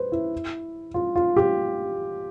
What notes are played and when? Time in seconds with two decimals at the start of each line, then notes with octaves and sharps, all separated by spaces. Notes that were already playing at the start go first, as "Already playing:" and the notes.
Already playing: B4 C5
0.12 E4
0.94 F4
1.16 F4
1.36 G4